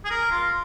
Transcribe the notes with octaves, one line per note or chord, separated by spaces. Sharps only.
G#4
A#4
F4